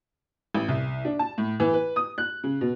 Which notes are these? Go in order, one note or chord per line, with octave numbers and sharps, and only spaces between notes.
A1
C2
D4
A5
A2
E3
B4
D#6
F#6
C#3
B2